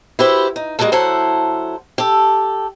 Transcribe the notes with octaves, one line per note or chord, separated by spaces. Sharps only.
E4 F#4 G4 B4 C5
D#4
G3 G#3 A#3 F#4 A4
F#3 E4 A4 C5 F#5
G4 A4